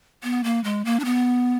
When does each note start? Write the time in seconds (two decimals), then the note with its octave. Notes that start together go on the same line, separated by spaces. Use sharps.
0.23 B3
0.44 A#3
0.64 G#3
0.85 A#3
0.99 D4
1.05 B3